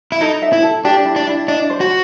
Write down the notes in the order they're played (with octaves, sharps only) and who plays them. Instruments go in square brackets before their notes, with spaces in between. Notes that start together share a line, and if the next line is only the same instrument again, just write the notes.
[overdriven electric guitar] E4
[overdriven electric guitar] D#4 [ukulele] A4
[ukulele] E5
[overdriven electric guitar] E4
[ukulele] A4
[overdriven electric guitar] D4 [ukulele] G4
[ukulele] E4
[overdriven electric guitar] D4
[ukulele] E4
[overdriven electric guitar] D4 [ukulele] D#5
[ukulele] C5
[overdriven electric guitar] F#4